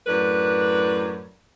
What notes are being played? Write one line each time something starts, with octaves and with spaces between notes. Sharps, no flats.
F#2 A2 D4 B4